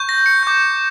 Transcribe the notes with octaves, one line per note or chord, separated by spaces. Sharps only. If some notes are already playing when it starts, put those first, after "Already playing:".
Already playing: C#6 G6
A#6
C#7
D6 G6